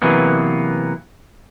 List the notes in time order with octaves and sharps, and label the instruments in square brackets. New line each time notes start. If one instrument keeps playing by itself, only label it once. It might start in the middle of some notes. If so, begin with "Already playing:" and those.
[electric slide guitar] C3 E3 F#3 A#3 B3